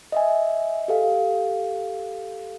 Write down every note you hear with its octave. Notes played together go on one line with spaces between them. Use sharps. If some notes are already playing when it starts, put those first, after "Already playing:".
D#5 E5 G#5
G4 A4 F5